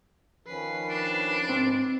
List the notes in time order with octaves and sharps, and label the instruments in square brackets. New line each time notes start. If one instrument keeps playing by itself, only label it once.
[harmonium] D#3 F3 C#4 [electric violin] B4 C7
[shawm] D4
[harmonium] G#2 [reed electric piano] C4